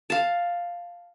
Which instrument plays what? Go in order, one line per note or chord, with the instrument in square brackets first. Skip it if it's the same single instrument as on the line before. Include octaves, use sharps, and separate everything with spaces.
[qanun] F5 A5